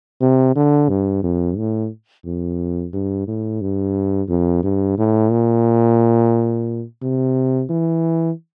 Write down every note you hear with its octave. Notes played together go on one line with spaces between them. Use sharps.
C3
D3
G2
F2
A2
F2
G2
A2
G2
F2
G2
A2
A#2
C3
E3